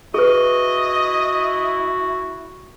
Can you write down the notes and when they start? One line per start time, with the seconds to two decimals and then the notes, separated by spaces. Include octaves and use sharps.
0.14 E4 F#4 G#4 B4 D#5